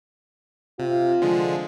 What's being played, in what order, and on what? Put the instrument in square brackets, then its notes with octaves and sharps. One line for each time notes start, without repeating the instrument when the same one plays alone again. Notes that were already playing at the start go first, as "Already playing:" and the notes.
[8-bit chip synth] C3 [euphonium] F4
[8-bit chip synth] D3 F3 G#3